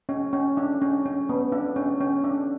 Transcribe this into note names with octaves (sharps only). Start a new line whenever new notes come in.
C#4
C#4
D4
C#4
C#4
B3
D4
C#4
C#4
D4